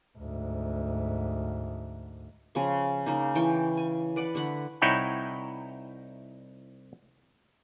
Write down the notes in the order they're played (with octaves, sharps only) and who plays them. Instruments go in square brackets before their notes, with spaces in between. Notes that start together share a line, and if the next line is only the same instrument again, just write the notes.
[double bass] D2 G#2
[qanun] C#3 F3 C#6
C#3 A#3 D#4
E3 G5 A5 C#6
G#5
B4 D5 F#5
D3 A3 F#5 B5
[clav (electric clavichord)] C2 D#4 E4 C#5 F#5 G5